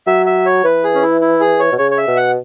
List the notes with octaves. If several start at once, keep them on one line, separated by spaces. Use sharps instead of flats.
F#3 E5
E5
C#5
E3 B4
G#4
C#4
E4
E4
G#4
C#5
B2
C#3 C#5
C#5
E5
B2
F#5